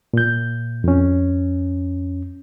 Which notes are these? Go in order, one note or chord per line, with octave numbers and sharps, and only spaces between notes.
A#2 G6
F2 C#4